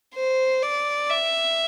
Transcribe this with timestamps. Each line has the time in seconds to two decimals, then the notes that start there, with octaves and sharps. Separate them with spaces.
0.15 C5
0.63 D5
1.10 E5